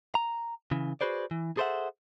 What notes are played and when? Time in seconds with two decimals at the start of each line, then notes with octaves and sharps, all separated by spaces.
0.15 A#5
0.71 C#3 E3
1.01 F#4 G#4 B4 C5 D5
1.31 E3
1.57 G#4 A4 C5 D5 E5 F#5